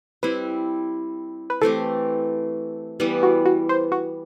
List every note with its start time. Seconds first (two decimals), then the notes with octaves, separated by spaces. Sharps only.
0.23 G3 C4 E4 B4
1.50 B4
1.61 E3 A3 C4 G4 A4
3.00 E3 G3 B3
3.23 F#4
3.45 F#4
3.69 C5
3.92 F#4